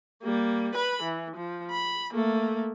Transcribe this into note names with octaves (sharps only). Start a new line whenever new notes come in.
G3 A#3
B4 B5
E3
F3
B5
A3 A#3